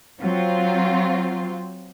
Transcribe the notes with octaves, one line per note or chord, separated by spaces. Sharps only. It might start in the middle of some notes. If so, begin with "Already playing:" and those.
F#3 C4 F4